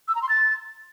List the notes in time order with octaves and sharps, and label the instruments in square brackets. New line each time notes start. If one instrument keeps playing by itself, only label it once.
[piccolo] E6
A#5
C6
A6